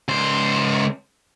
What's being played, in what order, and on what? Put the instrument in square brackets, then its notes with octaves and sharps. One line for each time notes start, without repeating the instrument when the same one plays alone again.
[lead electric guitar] C#2 C5